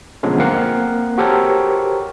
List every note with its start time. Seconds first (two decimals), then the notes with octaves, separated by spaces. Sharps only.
0.23 B2 D3 F3 F#3 G#3 C#4
0.40 A#3 C4 A#4 F5 F#5
1.18 F#4 G4 A4 A#4 C5 C#5